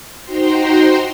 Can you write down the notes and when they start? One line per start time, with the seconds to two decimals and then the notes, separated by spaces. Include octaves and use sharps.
0.24 D#4 F#4 C5 G5 A#5 C6